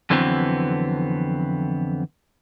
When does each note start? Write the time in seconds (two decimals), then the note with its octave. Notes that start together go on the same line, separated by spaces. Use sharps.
0.10 F2 D3 E3 F#3 B3 C4